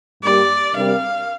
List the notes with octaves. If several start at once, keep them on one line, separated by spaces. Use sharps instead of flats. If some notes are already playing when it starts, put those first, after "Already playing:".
G2 G3 A#3 G4 A#4 D5
C3 G3 D4 G4 A#4 F5